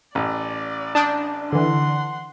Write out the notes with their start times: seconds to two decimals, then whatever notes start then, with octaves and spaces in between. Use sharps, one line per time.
0.15 A1 D5
0.95 D4 A5 D#6 G6
1.52 D3 E3 F#5 C6